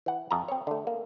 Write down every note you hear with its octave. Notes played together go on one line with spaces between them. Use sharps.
E3 F#5
F2 A5 A#5
C4 C#5
D3 A3
A#3